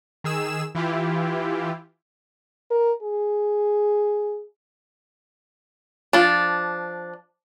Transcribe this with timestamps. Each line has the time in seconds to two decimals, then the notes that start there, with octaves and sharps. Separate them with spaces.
0.24 D#3 G#4 E6 E7
0.75 E3 E4 F4 G4
2.71 A#4
3.03 G#4
6.13 F3 D4